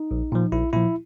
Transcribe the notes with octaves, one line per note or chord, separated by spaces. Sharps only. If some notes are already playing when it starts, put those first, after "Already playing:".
Already playing: D#4
A#1
A#2 F3
A#1 E4
A#2 F3 E4